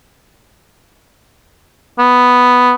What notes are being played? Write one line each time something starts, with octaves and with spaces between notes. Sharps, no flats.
B3